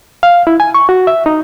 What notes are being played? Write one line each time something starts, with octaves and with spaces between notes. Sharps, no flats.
F5
E4
G#5
C#6
F#4
E5
D#4